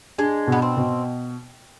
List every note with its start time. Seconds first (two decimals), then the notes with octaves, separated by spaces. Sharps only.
0.18 G#3 D4
0.47 B2
0.52 B3
0.62 C4
0.77 B2